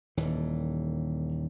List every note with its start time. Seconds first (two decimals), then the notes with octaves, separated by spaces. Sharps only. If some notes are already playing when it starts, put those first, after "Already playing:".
0.17 D#1 D#2 E3